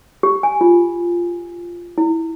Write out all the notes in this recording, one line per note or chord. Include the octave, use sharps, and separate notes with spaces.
G4
G#5
F4
E4